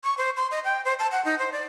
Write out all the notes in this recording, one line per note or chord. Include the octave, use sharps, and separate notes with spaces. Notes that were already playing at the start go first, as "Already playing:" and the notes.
C#6
C5
C6
D#5
G5
C5
A5
F#5
D#4
C5
D5